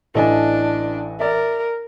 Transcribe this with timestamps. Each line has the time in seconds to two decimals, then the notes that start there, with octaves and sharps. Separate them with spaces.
0.15 A1 A2 E3 D4 A4 D#5 G#5
1.20 A#4 D5 E5